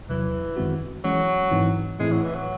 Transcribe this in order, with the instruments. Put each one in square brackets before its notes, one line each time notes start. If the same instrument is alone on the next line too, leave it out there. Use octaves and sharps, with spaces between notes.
[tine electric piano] E2 C3 F#3 [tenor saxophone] E3
[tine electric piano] F#2 D#3 G#3 C4 F#4
[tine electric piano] E3 G#3 C#4 [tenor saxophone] F#3
[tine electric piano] G#2 E3 C4 D#4
[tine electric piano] A2 E3 A3 C4 E4 [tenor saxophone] G#3
[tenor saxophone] F#3
E3
F#3